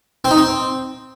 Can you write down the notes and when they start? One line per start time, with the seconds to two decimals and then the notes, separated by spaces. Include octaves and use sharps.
0.25 C4
0.31 D#4
0.37 C4